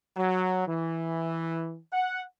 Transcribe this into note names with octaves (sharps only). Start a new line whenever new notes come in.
F#3
E3
F#5